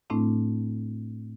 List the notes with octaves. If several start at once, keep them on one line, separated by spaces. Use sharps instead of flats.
A2 A3 C4 D4 E4